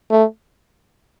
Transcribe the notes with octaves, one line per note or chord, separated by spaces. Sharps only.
A3